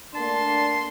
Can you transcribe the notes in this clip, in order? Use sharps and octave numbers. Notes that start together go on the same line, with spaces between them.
A3 A#3 D4 A5 C6